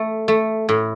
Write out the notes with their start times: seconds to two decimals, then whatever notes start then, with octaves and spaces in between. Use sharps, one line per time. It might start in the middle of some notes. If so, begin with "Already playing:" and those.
Already playing: A3
0.28 A3
0.69 A2